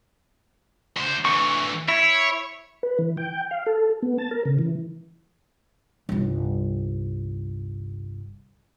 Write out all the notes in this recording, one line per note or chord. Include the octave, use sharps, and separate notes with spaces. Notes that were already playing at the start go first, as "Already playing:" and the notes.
D2 C5
D2 E3 C#6
E4 C#5
B4
E3
G5
F5
A4
B3
A5
A#4
C#3
E3
G1 C2